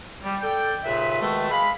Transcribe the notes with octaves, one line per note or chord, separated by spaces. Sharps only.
G3
A4 D5 G5
D#2 A#2 C#3 B4 E5
B2 D#3 G#3 A3
G#3 F5 B5